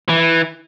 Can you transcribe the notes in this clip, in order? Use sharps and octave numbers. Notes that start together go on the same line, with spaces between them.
E3